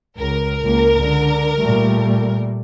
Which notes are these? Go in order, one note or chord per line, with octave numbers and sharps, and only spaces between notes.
C#2 A#4
C#2 A#3
D3
A#2 G3 A3